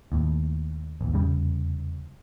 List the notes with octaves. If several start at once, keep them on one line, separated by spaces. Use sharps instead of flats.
D#2 A2
A1 D#2
F1 E2 C#3 G3